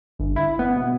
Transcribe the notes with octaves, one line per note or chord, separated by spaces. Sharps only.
G1
E4
B3
B2